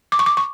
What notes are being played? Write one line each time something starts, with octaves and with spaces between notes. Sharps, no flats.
D6
C#6
D6
C#6